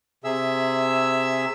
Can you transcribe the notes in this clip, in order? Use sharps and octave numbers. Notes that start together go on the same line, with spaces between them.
C3 G#4 E5 E6